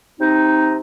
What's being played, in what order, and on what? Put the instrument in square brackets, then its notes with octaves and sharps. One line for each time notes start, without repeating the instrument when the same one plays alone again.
[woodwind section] C3 C4 D#4